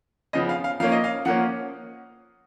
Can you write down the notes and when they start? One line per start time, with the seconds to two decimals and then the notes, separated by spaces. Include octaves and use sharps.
0.33 C#3 F3 B3 D#5
0.49 F5
0.64 F5
0.80 F3 A#3 C#4 F5
0.92 D#5
1.04 F5
1.25 F3 A#3 C#4 F#5